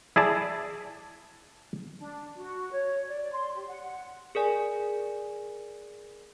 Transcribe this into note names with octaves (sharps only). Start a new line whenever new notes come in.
E4 G#4 D5 A5
D4
F#4
C#5
D5
C6
G4
F#5
G#4 A#4 D5 G#5